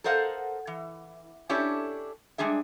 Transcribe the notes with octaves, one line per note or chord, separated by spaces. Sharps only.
A4 A#4 C5 D#5 F5 F#5
E3
C#4 D4 E4 G4 A4 C#5
G3 G#3 D4 G#4 E5